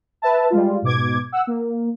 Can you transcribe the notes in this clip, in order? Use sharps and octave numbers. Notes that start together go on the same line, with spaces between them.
B4 E5 A5
G3 G#3 F4
G#2 B2 D6 G#6
F#5 E6
A#3